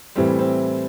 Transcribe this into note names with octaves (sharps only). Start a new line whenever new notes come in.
A2 E3 G3 C4
C4